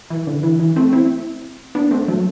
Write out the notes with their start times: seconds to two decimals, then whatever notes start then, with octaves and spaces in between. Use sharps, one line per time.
0.10 E3
0.27 D3
0.43 E3
0.60 E3
0.76 A3 C4
0.93 C4 E4
1.75 B3 D4
1.91 A3 C4
2.08 F#3 A3